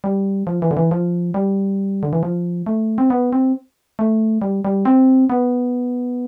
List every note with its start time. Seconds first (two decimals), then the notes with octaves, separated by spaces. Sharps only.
0.04 G3
0.47 F3
0.62 E3
0.71 D3
0.77 E3
0.91 F3
1.34 G3
2.03 D3
2.13 E3
2.23 F3
2.66 A3
2.98 C4
3.10 B3
3.33 C4
3.99 A3
4.42 G3
4.65 G3
4.85 C4
5.30 B3